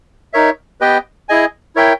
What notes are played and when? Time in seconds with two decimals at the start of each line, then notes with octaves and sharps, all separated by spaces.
0.33 D#4 A#4 C#5 E5
0.80 B3 G4 B4 D#5 G5
1.29 E4 G#4 D#5 G#5
1.76 E4 A#4 C#5 E5 G5